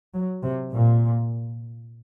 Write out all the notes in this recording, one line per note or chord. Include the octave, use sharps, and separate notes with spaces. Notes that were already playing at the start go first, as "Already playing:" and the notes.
F#3
C3
A#2